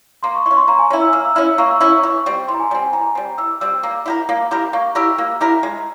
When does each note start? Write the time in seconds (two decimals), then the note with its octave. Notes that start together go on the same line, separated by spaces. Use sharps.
0.23 A#3 C6
0.35 C#6
0.46 E4 C#6
0.51 C#4
0.57 C6
0.68 A#3 A#5
0.79 G#5
0.90 C#4 E4 A#5
1.01 E6
1.13 A#3 F6
1.25 E6
1.35 C#4 E4 F6
1.46 E6
1.58 A#3 C#6
1.69 E6
1.81 C#4 E4 E6
1.93 C#6
2.03 E3
2.26 G3 C4
2.48 E3 C6
2.54 A#5
2.60 G#5
2.70 G3 C4 G#5
2.82 G#5
2.93 E3 A#5
3.15 G3 C4
3.38 E3 E6
3.61 G3 C4 E6
3.83 A#3
4.06 E4 G4 A#4
4.29 A#3
4.51 E4 G4 A#4
4.73 A#3 C#6
4.95 E4 G4 A#4 E6
5.18 A#3
5.41 E4 G4 A#4
5.63 G#3